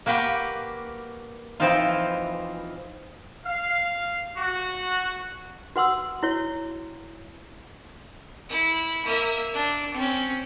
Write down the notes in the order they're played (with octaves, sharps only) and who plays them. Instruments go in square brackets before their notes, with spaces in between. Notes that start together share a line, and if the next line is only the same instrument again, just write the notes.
[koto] A#3 F#4 G4 B4 G5
E3 F3 C4 D#4 F4
[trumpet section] F5
F#4
[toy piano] F#4 B4 F#5 C6 D#6 E6
E4 F#4 C#5
[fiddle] E4
A#3 E5
D4
C4 C#4